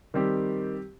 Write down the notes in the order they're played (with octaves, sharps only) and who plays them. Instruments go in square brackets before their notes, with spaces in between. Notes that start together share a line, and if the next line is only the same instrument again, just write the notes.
[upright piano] D#3 G3 C4 G4